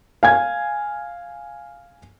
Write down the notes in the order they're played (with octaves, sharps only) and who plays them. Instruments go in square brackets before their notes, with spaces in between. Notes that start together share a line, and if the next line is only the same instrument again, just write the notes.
[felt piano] F5 G#5 G#6